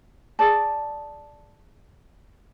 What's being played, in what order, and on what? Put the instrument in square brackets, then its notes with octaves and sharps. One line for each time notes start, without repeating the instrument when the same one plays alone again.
[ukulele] G#4 D5 A5